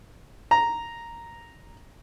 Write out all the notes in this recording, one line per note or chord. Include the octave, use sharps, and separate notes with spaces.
A#5